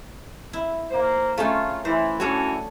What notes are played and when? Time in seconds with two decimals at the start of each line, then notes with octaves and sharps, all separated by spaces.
0.53 E4
0.91 A#3 C5
1.38 A3 C#4 D#4 F4
1.85 E3 C5
2.20 E3 C#4 D4 F#4 A4 C#5